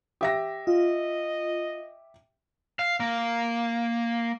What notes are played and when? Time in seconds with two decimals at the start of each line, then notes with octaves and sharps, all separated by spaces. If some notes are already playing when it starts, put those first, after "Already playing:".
0.21 G4 E5 A#6
0.67 F4 D#5
2.79 F5
3.00 A#3